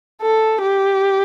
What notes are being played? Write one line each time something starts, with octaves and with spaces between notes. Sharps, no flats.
A4
G4